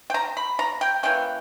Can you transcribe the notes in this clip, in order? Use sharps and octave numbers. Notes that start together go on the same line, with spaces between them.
G5
A#5
B5
A#5
G5
E3 A#3 C#4 G5